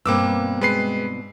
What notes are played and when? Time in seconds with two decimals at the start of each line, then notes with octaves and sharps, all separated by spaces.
0.06 G2 B2 A#3 C4 D6 E6
0.61 G#3 B4 C7